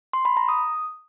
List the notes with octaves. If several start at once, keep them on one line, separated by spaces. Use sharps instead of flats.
C6
B5
A#5
D#6